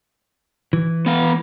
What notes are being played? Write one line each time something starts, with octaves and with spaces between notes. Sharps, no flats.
E3
B3 F5